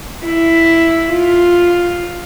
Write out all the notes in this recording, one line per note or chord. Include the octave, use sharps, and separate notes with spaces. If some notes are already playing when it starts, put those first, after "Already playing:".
E4
F4